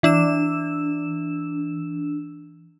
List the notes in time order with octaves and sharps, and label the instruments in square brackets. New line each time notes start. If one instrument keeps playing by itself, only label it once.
[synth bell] E3 D4 E6 E7